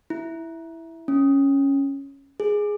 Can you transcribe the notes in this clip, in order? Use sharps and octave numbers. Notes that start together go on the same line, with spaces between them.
E4
C#4
G#4